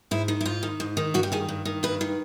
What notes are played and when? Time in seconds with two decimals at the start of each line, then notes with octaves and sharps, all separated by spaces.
0.11 G#2 E4
0.28 D#3
0.41 E4
0.45 G#2 F4
0.63 D#3
0.80 G#2
0.97 D#3
1.14 G2 F#4
1.23 G4
1.32 D#3 G#4
1.49 G2
1.65 D#3
1.83 G2 B4
2.01 D#3